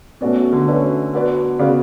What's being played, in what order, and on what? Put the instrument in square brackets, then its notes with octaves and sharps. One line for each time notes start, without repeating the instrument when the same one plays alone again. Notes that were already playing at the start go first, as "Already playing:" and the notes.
[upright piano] B2 [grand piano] A3 C#4 F#4 B4 D5
[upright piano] D3
[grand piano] A3 C#4 F#4 B4 D5
B3 F#4 B4 D5
[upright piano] C#3 [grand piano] B3 F#4 B4 D5